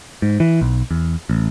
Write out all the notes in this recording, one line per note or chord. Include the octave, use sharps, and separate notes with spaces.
G#2
E3
B1
E2
A1